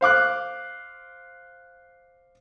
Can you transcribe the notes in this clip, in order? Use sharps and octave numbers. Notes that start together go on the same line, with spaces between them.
C5 F5 D6 F#6